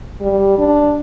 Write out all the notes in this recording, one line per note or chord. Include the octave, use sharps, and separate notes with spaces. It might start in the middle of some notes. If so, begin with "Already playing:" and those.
G3
D4